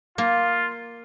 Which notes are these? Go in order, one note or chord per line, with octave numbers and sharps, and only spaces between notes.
A#3 F4